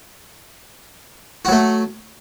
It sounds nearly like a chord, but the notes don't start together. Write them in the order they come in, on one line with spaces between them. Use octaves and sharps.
F#4 F#3 A3